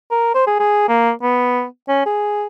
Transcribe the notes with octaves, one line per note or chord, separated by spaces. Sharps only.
A#4
C5
G#4
G#4
A#3
B3
C#4
G#4